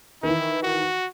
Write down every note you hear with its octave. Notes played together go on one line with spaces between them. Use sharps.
D#3 E3 E4
F#4